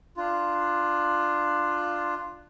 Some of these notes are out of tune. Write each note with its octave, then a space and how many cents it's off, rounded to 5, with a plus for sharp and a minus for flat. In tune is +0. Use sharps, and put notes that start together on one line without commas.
D4 +15 F4 +0